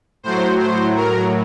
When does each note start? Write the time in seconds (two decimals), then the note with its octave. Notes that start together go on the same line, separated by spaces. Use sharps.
0.23 A2 F#3 C5
0.59 C5
0.95 A#4